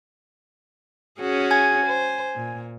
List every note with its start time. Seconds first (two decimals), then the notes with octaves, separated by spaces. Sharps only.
1.20 C#4 F#4 G#4
1.51 G#5 G#6
1.86 C5
2.36 A#2